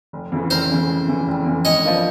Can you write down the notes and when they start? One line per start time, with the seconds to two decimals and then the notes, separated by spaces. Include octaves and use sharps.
0.13 F1
0.32 F2 C#3 E3
0.50 F1 A#4 C5
0.70 F2 C#3 E3
0.89 F1
1.08 F2 C#3 E3
1.28 F1
1.46 F2 C#3 E3
1.65 G#1 C#5 D#5
1.84 F3 A#3 D4